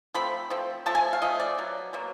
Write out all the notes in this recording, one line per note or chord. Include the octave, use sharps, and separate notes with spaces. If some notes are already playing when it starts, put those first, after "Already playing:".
F3 A3 C4 B5
F3 A3 C4
F3 A3 A5
G#5
F5
F3 A3 D#5
D5
B2 F#3
B2 F#3 A#3